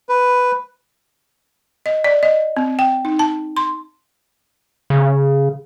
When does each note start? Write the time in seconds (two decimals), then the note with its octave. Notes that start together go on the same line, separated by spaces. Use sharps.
0.09 B4
1.86 D#5
2.04 D5
2.23 D#5
2.57 C4
2.79 G5
3.05 D#4
3.19 A5
3.57 C6
4.90 C#3